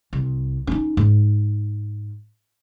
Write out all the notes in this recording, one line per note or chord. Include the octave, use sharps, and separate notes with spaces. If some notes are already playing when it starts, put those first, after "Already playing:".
C2
C#4 D#4
G#2